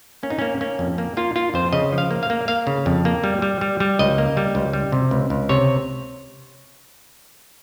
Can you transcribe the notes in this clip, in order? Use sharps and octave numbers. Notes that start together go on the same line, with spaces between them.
A#3 C#4
D#4
A#3 C#4
A#3 C#4
F2
A#3
A#3 F4
A#3 F4
F2 C5
C#3 D#5
F3
F5
A#3
F5
A#3
A#3 F5
C#3
F2
A#3
G3
G3
G3
G3
C#2 D#5
A#3
G3
C#2
G3
C3
C#2
C#2
C3 C#5